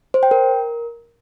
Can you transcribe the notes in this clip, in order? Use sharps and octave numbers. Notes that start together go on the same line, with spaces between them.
C5
G5
A#4